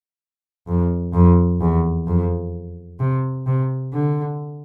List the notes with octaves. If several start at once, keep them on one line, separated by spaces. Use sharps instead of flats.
F2
F2
E2
F2
C3
C3
D3